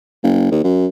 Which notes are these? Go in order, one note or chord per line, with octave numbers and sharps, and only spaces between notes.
F#1
D#2
F#2